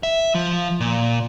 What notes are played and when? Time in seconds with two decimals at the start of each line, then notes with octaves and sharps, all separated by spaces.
0.03 E5
0.35 F3
0.80 A#2